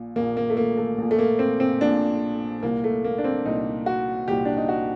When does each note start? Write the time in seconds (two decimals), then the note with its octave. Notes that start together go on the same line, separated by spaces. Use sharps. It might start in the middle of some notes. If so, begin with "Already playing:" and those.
Already playing: A#1 A#2
0.16 A#1 A#2 A#3
0.37 A#3
0.50 A3
0.57 A#3
0.77 A3
0.98 A#1 A#2
1.11 A3
1.19 A#3
1.39 C4
1.60 C4
1.81 A#1 A#2 D4
2.63 C2 A#2 A#3
2.84 A3
3.04 A#3
3.18 D4
3.24 C4
3.45 C2 A#2 D#4
3.86 F#4
4.28 C2 A#2 G4
4.45 D4
4.57 D#4
4.68 F#4